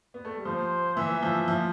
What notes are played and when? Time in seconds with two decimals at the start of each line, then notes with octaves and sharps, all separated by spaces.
0.14 B3
0.25 A3
0.35 G3
0.45 F3 C5
0.96 E3 E5
1.23 F3
1.48 F3